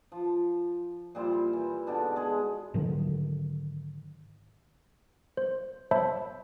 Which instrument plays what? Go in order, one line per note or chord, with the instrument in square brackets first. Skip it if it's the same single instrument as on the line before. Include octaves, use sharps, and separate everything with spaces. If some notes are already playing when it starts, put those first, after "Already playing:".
[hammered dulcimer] F3
A#2 G3 E4 C5
E3
G#2 B2 D3 D4
G#3 G#4
[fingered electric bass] G#2 D3 D#3 F#3
[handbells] C5
C5 C#5 E5 A5 B5